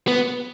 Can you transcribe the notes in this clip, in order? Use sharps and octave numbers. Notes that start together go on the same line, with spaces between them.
B3